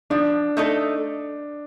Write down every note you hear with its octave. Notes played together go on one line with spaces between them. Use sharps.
F3 D4
A3 D#4 A4